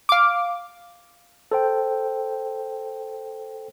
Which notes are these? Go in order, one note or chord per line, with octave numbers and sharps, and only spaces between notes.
F5 D6
A4 C5 G5